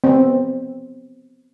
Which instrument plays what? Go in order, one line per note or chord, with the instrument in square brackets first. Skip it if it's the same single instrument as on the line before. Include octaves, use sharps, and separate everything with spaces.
[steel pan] B3 C4